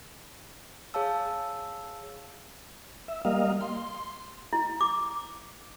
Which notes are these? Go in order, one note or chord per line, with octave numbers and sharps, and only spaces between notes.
G#4 C#5 F5 A5 E6
E5
G3 A#3 D#5 F5
C6
E4
D6